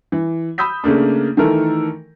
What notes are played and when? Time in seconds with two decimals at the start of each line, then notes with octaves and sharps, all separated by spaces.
0.12 E3
0.58 B5 D#6 E6 G6 B6
0.84 C#3 A3 A#3 D4
1.37 D#3 E3 A3 A4 A#4